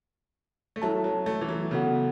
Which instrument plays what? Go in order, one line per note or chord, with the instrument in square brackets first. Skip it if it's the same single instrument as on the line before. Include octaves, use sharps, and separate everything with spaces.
[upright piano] A3
[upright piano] F#3 [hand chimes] E4 A4 C#5 E5 A5
[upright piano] F#3
A3
E3
F#3
[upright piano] C#3 [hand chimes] B3 F#4 A4 F#5